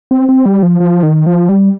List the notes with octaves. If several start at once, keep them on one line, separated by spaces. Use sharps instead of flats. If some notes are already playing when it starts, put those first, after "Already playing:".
C4
C4
G3
F3
F3
D#3
F3
G3